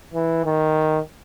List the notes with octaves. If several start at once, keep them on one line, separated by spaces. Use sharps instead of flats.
E3
D#3